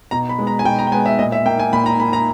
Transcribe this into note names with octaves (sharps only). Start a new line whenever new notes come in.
B2 A#5
B5
G#3 B3
A#5
G#5
B2 G5
A#5
G5
G#3 B3 G#5
E5
A#2 D#5
E5
A#3 G5
G#5
A#2 B5
A#5
A#3 B5
A#5